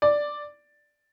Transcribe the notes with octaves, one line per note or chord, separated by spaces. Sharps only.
D5